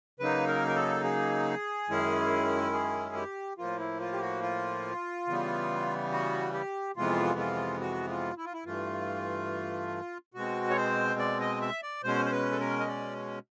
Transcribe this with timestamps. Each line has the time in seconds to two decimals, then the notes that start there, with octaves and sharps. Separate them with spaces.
0.20 C#3 F#3 A#3 D#4 B4
0.47 A#4
0.68 A#4
0.76 A4
1.04 G#4
1.89 F#2 D#3 G#3 C#4 E4
2.73 G#4
3.09 G#4
3.15 G4
3.58 A2 F3 A#3 F4
3.79 E4
4.00 F4
4.13 G4
4.21 F#4
4.42 F4
5.27 C#3 E3 G3 B3
6.12 F#4
6.53 G4
6.96 F2 C3 E3 G#3 B3 F4
7.39 F4
7.81 F#4
8.09 F4
8.37 E4
8.45 F4
8.53 E4
8.65 G2 E3 A3 F4
10.34 B2 G#3 C4 F#4
10.70 C#5
10.77 C5
11.19 D5
11.40 D#5
11.62 E5
11.83 D5
12.04 B2 G#3 C#4 C5
12.26 C5
12.32 B4
12.51 A4
12.60 A#4
12.80 D#5
12.88 D5